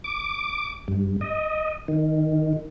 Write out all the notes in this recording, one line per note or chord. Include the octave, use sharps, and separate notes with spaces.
D6
G2
D#5
D#3